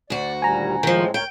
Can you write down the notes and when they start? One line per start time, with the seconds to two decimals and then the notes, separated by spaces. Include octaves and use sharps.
0.10 D2 F#4 D5
0.42 D#2 A#2 G3 G#5 A#5
0.83 A2 D#3 F3 G#3 C4
1.14 D2 A#4 C#5 G5